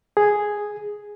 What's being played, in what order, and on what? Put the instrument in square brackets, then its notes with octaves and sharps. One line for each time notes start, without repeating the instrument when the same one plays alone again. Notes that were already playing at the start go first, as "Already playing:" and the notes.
[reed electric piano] G#4